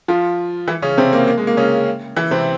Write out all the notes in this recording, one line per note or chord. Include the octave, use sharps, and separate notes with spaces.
F3 F4
E3 E4
C#3 C#4
C3 C4
A#3
A#3
G#3
A#3
C#3 C#4
E3 E4
C3 C4